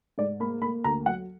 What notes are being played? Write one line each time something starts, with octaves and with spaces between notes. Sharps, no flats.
G#2 D5
A#3 B5
A#3 B5
D2 A#5
F#3 F#5